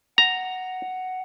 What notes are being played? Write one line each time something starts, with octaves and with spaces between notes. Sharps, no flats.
F#5 A#5